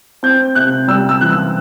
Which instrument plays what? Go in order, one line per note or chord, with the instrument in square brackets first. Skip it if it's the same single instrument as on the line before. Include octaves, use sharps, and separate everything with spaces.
[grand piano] C4 G6
C3 F#6
G3 E6
E6
E3 F#6
E6